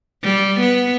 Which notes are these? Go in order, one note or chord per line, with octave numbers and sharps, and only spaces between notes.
G3
B3